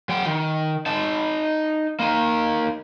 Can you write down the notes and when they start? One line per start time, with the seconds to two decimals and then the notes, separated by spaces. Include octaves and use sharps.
0.09 F#3 G5
0.26 D#3
0.86 D#4 A5
2.00 A#3 D#4